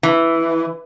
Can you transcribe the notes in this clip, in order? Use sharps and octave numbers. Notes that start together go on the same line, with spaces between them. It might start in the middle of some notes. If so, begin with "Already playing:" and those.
E3